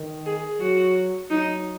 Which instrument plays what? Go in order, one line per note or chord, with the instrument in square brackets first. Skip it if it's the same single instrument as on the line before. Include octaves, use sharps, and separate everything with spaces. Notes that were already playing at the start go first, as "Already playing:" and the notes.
Already playing: [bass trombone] D#3
[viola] G#4
[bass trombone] F#3 [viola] F#4
[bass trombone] F#3 [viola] D#4